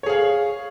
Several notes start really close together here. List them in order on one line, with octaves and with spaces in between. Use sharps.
C#5 G#4 F5